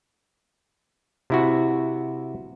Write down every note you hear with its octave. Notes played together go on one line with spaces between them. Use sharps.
C3 E4 F#4